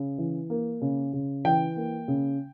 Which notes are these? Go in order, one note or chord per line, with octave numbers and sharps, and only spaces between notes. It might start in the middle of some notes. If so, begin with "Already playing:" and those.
Already playing: C#3
E3
A#3
C#3
C#3
E3 G5
A#3
C#3